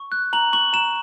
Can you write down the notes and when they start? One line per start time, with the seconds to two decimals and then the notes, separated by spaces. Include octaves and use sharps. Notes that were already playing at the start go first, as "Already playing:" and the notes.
Already playing: C#6
0.12 F#6
0.33 A#5 F#7
0.53 C#6 F#7
0.73 A#5 E7